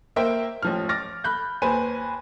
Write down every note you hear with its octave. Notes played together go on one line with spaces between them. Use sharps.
A#3 A#4 C5 E5 G5
A1 F3 F6
D6 F6 A6 A#6
B5 F#6 G6
D#2 B4 C5 G#5 B5 D#7